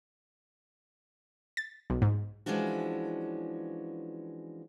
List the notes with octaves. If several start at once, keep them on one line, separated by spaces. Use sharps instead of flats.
A6
B1
G#2
E3 F3 G#3 C#4 D4 F#4